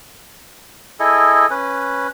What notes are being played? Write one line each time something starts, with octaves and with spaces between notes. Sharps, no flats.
E4 G#4 A4 D#5
C#4 B4